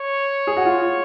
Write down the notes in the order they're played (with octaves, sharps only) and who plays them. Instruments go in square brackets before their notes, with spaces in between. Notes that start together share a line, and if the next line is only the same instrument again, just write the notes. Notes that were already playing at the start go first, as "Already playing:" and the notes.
Already playing: [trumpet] C#5
[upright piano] G#4
F#4
F4